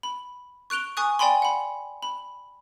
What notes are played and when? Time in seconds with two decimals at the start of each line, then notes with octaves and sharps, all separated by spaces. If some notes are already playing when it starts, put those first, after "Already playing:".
0.03 B5
0.70 C#6 F#6 D7 F7 G7
0.97 G#5 C#6 D#6 F#6
1.19 D5 G5 G#5 B5 C6
1.42 F#5 B5
2.02 B5